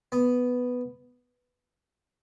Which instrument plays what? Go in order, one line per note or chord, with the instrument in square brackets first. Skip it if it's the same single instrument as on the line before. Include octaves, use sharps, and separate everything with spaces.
[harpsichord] B3